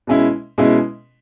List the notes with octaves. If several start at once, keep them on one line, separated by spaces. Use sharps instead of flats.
B2 G#3 C#4 E4
B2 G#3 C#4 E4